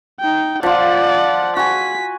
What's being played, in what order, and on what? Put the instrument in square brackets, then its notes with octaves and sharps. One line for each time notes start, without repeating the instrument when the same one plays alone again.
[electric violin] D#4 G5
[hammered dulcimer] F3 F4 [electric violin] D5 F#5
[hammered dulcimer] F#4 G#5 [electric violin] B6